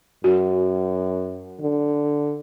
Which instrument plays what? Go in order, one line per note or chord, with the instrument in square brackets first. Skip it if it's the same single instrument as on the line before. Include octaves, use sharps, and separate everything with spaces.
[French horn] F#2 [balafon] F#4
[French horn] D3